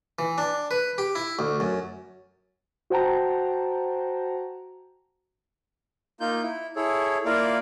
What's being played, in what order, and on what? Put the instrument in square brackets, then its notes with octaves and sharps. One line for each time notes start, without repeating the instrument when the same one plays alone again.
[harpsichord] E3
D4
B4
G4
E4
D2
F#2
[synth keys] F#4 C5 F#5 G5 A5 A#5
[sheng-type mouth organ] A#3 D#4 F4 G6
E4
E4 G#4 A4 C#5
A#3 E4 F4 A#4 D5 F5